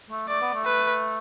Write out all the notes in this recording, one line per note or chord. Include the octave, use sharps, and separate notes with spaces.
A3
A3 D5
B3
A3
B4